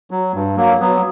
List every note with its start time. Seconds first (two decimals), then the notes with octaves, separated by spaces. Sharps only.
0.11 F#3
0.34 G2
0.57 F#3 A#3
0.80 F#3 B3